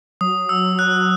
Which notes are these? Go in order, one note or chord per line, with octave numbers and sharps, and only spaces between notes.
F#3 D#6
E6
F#6